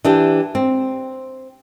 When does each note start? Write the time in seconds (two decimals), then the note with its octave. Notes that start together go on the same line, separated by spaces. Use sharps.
0.05 E3 D4 G4
0.55 C4